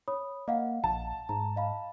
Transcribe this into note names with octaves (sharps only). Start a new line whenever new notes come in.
C#5 B5 D#6
A#3 D#5 F5 F#5
A#1 A5
G#2 A#5
D#5 F5 B5